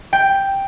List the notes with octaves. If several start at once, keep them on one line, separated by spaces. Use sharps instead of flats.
G5